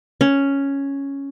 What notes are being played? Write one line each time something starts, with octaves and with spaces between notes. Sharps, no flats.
C#4